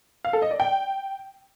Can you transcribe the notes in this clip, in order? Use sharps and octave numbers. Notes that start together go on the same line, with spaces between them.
F5
A4
D#5
D5
G5